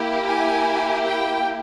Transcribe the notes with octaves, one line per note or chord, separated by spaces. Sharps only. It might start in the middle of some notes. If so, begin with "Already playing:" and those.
Already playing: A#3 E4 G4
G#5
G5